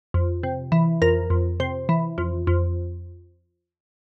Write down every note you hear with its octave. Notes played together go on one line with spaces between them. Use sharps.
F2
C3
E3
F2 A#4
F2
C3 C5
E3
F2
F2